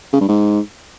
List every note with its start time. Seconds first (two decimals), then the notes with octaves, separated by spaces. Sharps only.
0.13 C#3
0.21 G2
0.28 G#2